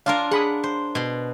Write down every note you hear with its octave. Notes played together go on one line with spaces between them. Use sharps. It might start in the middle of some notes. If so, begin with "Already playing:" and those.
D4 F4 A#4 F5
G#4 F#5 B5 D#6
C5
B2 C6